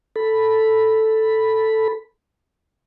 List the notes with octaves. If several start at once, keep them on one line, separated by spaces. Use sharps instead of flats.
A4 B5